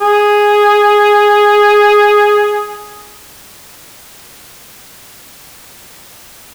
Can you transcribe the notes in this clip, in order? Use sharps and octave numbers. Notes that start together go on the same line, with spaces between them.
G#4